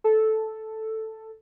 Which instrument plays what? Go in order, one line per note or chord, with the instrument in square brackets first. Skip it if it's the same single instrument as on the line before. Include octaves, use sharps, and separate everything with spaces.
[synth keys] A4